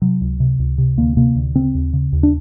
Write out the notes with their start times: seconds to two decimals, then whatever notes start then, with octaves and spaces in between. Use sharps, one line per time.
0.02 C3 F#3
0.21 C#2
0.40 C3
0.59 C#2
0.78 C3
0.97 D2 A#3
1.17 C3 A#3
1.35 D2
1.55 C#3 C4
1.74 D#2
1.93 C#3
2.13 D#2
2.23 D4